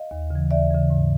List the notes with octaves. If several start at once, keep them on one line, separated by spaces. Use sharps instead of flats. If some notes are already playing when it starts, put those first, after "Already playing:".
Already playing: D#5 F5
D#2
C#3 E3
D#2 D5 E5
C#3 E3
G#2